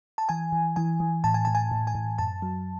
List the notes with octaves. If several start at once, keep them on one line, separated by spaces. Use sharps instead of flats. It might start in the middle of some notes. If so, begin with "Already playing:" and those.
A5
E3 G#5
E3
E3 G#5
E3
A2 A5
G#5
A2 A5
G#5
A2
G#5
A2
F#2 A5
F#3